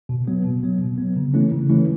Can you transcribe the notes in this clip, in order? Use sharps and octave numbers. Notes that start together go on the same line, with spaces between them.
B2
F#3 B3
B2
F#3 B3
B2
F#3 B3
C#3
E3 A3 C#4 E4
C#3
E3 A3 C#4 E4